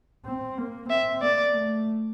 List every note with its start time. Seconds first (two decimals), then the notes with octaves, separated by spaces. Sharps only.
0.25 C4
0.57 A#3
0.89 C4 E5
1.22 A#3 D5
1.54 A3